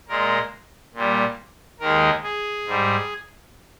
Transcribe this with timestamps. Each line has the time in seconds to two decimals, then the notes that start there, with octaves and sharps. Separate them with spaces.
0.08 A#2 G#3 A#4
0.94 A#2 G3
1.80 D#2 D#3 G#3 A#4
2.23 G#4
2.66 G#2 G3